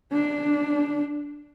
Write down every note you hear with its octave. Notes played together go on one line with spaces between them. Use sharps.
D4